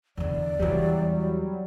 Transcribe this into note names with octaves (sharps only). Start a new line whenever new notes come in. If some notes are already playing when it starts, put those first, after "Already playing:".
E2 D3 D5
E2 E3 F#3 G3